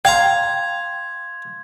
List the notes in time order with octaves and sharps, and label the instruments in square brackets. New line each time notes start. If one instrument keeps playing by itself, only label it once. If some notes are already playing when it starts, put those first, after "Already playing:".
[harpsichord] F5 A#5 [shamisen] G5 [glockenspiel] C6 G#6